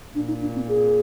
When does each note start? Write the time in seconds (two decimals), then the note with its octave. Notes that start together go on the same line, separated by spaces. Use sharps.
0.15 A#2 D4
0.28 D#4
0.41 D4
0.55 C4
0.69 G#4